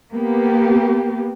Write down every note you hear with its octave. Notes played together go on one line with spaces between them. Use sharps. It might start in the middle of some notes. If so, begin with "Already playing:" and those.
A#3 B3 G4